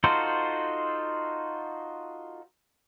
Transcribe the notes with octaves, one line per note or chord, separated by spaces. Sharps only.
D#4 F4 F#4 A4 C5